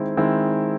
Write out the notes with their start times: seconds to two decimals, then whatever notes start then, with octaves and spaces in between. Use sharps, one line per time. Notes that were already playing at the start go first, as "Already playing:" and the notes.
Already playing: D#3 G#3 C4 E4
0.17 D#3 G#3 C4 E4